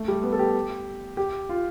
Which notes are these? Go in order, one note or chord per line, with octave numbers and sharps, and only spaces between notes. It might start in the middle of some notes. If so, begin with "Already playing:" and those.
Already playing: A3
G3
B3
A4
G4
G4
F4